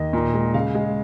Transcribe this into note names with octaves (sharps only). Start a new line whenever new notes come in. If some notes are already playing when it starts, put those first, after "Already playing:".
Already playing: D#2 D#5
A#2
G#3
C#3 F5
G#3